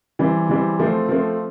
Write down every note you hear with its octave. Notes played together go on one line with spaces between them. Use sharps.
E3 G3 C4
E3 G3 C4
F3 A3 C4
F3 A3 C4